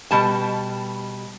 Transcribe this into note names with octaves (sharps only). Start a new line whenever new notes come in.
B2 G3 A5